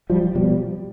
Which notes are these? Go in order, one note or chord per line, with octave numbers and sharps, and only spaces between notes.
F3 G3
B2 F3 G3